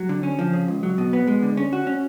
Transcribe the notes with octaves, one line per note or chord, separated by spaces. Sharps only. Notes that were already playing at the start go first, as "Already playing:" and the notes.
Already playing: F#3
D3
C#4
F3
C#3
C#2
F#3
B2
B3
G#3
D3
C#4
F#4
C#4